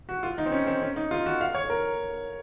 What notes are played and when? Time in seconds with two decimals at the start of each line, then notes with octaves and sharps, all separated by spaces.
0.09 F#4
0.23 F4
0.38 D#4
0.46 C4
0.52 C#4
0.67 C4
0.82 C#4
0.96 D#4
1.11 F4
1.26 F#4
1.41 F5
1.55 C#5
1.70 A#4